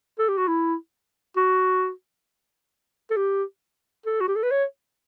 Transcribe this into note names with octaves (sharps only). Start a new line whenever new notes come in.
A4
G4
F#4
E4
F#4
A4
G4
A4
F#4
G4
A4
B4
C#5